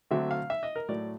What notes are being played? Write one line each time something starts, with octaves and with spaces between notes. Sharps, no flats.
D3 F#3 A3 C4 E5
F5
E5
D#5
A#4
A2 F#3 A3 D5